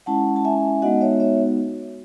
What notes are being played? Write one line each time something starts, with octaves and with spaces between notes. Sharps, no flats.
G#3 C#4 E4 F#5 A5
A5
E5 G#5
G#3 B3 D#4 F#4 D#5 F#5
C#5 E5
C#5 E5